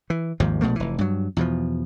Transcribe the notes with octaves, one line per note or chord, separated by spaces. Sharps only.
E3
G#1 D#2 G#2 F3
A#1 B2 A3 A#3
F1 E3
G2 F#3
E2 B2 F3